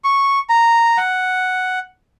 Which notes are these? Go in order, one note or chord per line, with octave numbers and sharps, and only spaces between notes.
C#6
A#5
F#5